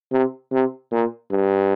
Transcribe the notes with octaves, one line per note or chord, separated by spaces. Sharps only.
C3
C3
A#2
G2